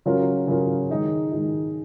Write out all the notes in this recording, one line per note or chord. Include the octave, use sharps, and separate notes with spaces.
C#3 F#3 C#4 F4 A#4
C#3 F#3 C#4 F4 A#4
D#3 G#3 D#4
D#3 G#3 D#4